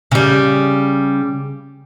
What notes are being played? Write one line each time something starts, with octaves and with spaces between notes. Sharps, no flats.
C#3 G3